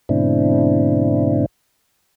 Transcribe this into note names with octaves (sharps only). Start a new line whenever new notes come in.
G#2 B2 D3 C4 D4 E4